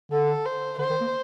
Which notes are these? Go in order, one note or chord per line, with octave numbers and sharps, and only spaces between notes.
D3 A4
C5
D3 C5
D#3
A#3